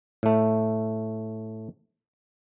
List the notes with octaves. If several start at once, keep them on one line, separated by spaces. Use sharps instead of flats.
A2 A3